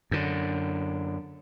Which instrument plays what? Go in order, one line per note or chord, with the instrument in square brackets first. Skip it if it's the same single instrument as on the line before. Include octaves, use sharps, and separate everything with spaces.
[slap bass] F#2 D3